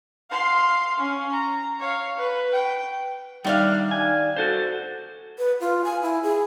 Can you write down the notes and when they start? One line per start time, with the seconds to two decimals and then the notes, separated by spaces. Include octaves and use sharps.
0.30 F5 C6
0.97 C#4
1.31 A#5
1.79 C#5 F5
2.17 B4
2.52 G5
3.45 D#3 G3 D4 D#4 E5 F5
3.91 G#5
4.36 F#4 A4 C5
5.38 B4
5.60 F4
5.84 G#5
6.02 E4
6.23 G#4